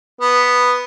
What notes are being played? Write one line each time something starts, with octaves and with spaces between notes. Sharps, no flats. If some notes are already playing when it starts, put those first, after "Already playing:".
B3